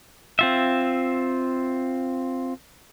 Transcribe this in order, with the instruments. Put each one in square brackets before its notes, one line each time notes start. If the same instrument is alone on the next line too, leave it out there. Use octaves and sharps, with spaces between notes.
[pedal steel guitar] C4 F4 E5